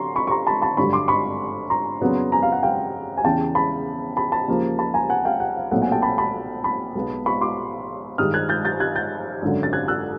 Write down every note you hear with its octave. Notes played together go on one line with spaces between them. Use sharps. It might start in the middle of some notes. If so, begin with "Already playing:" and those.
Already playing: D3 F#3 A#5 C6 C#6
B5 C#6
C#6
A#5 C6
A5 B5
A5 B5
G#1 G2 D3 F#3 B5 C#6
C6 D6
B5 C#6
A#5 C6
F2 C#3 F#3 B3 D4
G#5 A#5
F5
F#5
F5 G5
G#5
E2 C#3 E3 G5 A5
A5 B5
A5 B5
A5 B5
D#2 C#3 F3 A#3
A5 B5
G#5 A#5
F#5 G#5
F5 G5
F#5
F5
B1 A#2 F#3 A3 C4 F#5
F#5 G#5
G5 A5
A5 B5
A5 B5
A5 B5
B1 B2 G#3 B3
B5 C#6
C6 D6
G2 D#3 G#3 D#6 F6
F#6 G#6
G6 A6
G6 A6
F#6 G#6
G6 A6
G#1 F#2 D3 F#3
A6
F#6 G#6
E6 F#6